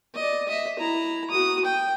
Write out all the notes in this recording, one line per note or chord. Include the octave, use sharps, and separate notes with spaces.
D5 D#5
D#5 E5
E4 A#5
F#4 D#6
G5